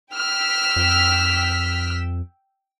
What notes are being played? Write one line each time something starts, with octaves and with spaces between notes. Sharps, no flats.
G5 E6 F6 B6
F2